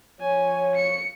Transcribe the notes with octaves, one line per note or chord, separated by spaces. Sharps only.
F3 C#5 G#5
C#7